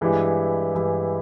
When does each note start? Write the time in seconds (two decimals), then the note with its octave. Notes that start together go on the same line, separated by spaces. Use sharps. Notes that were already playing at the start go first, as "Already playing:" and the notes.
0.01 G2 E3 G#3 E4 G4
0.75 G2 E3 G#3 E4 G4